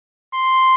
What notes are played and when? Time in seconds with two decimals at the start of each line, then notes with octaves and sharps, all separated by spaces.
0.34 C6